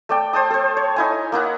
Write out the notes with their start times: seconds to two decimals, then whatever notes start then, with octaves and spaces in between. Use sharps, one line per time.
0.09 A3 D5 G5
0.33 C5 G5 A5 D#6
0.50 A4 C5
0.77 C#5
0.96 D#4 E4 G#5
1.32 A#3 D#4 E4 F#5